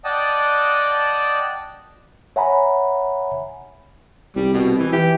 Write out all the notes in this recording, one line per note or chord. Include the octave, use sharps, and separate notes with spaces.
D5 D#5 F#5 G5 A5 D#6
C#5 E5 F#5 G#5 A#5 B5
C2 G3
B2
E3
E3 G4